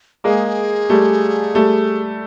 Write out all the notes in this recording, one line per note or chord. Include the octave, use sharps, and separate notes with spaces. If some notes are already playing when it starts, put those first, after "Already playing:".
G#3 A#3 G#4
G3 A3
G3 A3